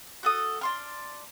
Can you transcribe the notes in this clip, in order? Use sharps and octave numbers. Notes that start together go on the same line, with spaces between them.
F#4 A4 D#6
D4 C6 F6